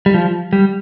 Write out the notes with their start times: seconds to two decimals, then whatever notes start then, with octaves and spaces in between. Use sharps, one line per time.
0.06 G3
0.14 F3
0.53 G3